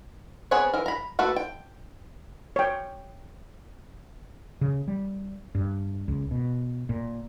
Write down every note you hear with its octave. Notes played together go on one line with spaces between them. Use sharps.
B3 C4 G#4 C#5 F#5
E3 A#4
A#5 B5
A3 A#3 F#4 A4 B4
G5
C#5 G5
C#3
G3
G2
C#2
B2
A#2